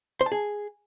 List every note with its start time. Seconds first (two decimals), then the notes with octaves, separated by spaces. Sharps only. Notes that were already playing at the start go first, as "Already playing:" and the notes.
0.21 C5
0.26 A5
0.32 G#4